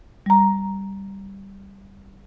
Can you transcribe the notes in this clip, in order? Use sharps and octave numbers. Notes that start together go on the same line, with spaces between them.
G3 A#5